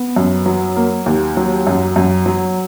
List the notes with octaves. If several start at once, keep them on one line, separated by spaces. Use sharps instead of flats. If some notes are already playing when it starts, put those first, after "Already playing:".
Already playing: B3
F#2
F#3
A#3
D#2
F#3
F#2
F#2
F#3